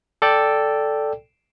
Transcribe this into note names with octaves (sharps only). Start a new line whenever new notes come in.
A4 D5 G5